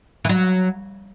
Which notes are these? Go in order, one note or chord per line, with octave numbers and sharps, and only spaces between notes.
E3
F#3